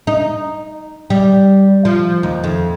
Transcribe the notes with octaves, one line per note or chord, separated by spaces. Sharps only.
D#4
G3
F3
D#2
F2